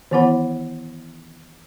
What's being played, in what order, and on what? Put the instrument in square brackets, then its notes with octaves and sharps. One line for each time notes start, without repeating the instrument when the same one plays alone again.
[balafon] D#3 E3 B3 E4 F#5 B5